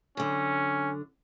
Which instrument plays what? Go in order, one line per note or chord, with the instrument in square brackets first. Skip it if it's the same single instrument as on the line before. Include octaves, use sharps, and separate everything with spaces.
[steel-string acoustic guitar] F#2 D3 [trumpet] C#4